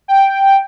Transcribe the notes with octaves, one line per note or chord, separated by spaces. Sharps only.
G5